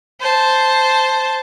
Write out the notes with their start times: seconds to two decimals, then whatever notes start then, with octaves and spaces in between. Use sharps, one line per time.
0.20 C5 A5